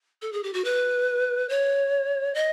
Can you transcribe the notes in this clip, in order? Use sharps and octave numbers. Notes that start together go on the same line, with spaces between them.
A4
G#4
G4
F#4
B4
C#5
D#5